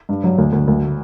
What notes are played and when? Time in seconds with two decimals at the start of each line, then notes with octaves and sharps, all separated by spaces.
0.09 G2
0.24 F#3
0.38 D2
0.52 D2
0.67 D2